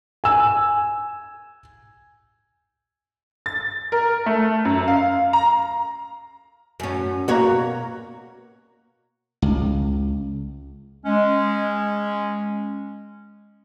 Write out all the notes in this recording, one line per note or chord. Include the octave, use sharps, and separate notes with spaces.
G#5 E6
A6
A#4
A3
F#2
F5
A#5
F#2 C#4
B2 A#3 F#4 C#5 A#5
C#2
G#3 C#4